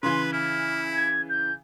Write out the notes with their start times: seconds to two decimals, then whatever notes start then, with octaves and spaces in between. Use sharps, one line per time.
0.03 C#3 E3 B4 C6
0.33 E4 F6
0.95 G#6
1.29 G6